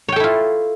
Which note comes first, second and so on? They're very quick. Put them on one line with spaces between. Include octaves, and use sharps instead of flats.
C#5 G5 A4 E4 F4